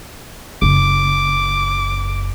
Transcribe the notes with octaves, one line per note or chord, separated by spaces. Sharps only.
F#1 D6